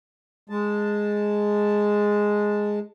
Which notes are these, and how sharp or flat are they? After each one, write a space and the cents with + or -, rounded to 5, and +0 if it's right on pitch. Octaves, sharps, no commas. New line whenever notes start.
G#3 +0 A5 +0